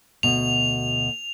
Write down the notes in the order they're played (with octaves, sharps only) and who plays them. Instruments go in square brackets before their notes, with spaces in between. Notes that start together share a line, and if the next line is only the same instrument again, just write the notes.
[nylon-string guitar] D2 B2 [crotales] F7